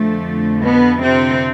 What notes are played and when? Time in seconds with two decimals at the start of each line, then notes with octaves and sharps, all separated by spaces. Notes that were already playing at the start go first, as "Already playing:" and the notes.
Already playing: F2 D3 F3 A3
0.65 B2 B3
1.04 C3 C4